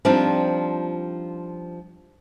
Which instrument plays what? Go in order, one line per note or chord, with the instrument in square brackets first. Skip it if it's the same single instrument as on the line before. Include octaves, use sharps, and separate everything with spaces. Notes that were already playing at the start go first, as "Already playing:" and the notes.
[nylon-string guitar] F3 G3 C4 D4 D#4 F4